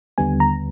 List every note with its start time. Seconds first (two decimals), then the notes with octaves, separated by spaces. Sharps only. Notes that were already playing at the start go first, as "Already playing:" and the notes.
0.18 D#2 D3 G3 B3 G#5
0.40 A#5